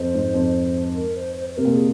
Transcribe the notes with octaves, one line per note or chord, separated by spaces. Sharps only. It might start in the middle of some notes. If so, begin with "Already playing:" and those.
Already playing: F2 C5
G#2
F2
A#4
C5
C5
C5
C3 A#4
A#2
G#4